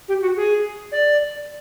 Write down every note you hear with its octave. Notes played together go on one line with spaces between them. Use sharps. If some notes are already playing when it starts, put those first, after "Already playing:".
G4
F#4
G#4
D5